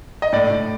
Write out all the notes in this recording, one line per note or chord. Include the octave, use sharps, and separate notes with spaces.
D#5
A2 D5
A2